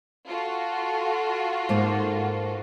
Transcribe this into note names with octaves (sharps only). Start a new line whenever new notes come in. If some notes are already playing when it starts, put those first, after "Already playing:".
F4 F#4 A4
G#2 A#3